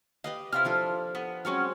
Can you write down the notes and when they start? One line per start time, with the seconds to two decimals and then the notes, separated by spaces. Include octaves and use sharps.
0.24 G4 B4 D#5 F5
0.52 C3 E4 F4 F6
0.65 F3 D4 A4
1.15 B3
1.45 F#3 G#3 C4 C#4 F#4 F6